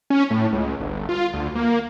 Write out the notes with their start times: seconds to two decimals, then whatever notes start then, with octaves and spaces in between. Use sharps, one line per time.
0.10 C#4
0.30 A2
0.53 C#2
0.80 G1
1.09 F4
1.34 D2
1.55 A#3